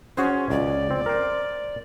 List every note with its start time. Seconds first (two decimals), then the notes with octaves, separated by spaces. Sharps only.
0.17 C#4 F#4 G#4 C5
0.50 C#2 D5
0.90 C4
1.06 A#4 C5